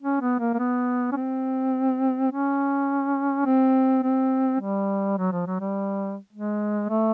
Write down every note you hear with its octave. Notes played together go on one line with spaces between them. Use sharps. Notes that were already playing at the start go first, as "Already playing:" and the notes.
C#4
B3
A#3
A#3
B3
C#4
C4
C#4
C4
C4
G3
F#3
F3
F#3
G3
G#3
A3